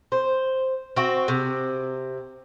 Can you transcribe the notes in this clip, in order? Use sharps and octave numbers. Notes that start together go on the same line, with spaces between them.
C5
C4 F#4
C3